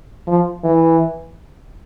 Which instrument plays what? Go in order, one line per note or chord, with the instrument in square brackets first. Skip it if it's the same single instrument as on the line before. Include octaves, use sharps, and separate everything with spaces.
[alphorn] F3
E3